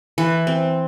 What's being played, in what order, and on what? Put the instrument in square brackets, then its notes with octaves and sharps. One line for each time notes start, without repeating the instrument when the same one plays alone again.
[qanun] E3
C4